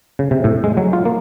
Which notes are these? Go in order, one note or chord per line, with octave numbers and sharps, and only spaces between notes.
C#3
C3
A2
G#3
F#3
F4
A#3